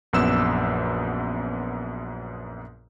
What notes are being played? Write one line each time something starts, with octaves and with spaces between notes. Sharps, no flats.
A#1 F#2 B3 E6 E7